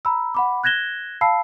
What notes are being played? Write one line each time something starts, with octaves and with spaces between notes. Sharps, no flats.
A#5 B5 E6
F#5 B5 D6
F#6 G#6 A#6 E7 G7
F5 A5 B5 E6 C7